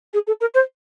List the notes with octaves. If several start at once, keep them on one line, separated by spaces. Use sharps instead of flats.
G#4
A4
A#4
C5